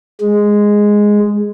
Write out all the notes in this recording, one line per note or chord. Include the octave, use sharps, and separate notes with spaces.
G#3